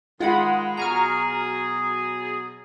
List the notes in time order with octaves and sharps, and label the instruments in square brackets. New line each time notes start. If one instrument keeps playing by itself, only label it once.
[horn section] D#3 G#3 [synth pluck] F4 F#5 B5
[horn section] B2 F#3 G#4 [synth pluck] A#5 C#6 F6